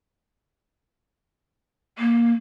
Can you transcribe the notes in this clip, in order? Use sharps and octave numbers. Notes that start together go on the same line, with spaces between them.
A#3